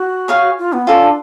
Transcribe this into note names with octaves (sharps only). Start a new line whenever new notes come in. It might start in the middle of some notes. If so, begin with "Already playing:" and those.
Already playing: F#4
G#4 C#5 F5 G#5
F4
B3
C#4 F4 A4 D5
D4